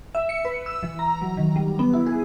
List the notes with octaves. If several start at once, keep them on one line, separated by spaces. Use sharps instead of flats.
E5
C#7
B4
E6
E3
A#5
F#3
D#3
G3
B3
E4
G#4